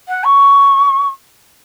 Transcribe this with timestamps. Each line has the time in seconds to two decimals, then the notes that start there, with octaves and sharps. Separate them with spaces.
0.08 F#5
0.24 C#6